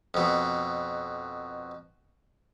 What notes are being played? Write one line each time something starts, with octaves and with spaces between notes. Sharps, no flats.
F2 B2